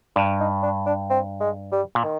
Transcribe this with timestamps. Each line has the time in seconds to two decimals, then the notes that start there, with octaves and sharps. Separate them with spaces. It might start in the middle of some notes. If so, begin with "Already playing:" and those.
0.16 G2 D4
0.40 D#4
0.63 D4
0.86 D4
1.10 C4
1.40 G#3
1.72 G3
1.95 A#2
2.04 D#3